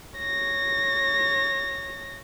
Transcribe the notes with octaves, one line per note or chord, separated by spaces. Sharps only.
C#5 A#6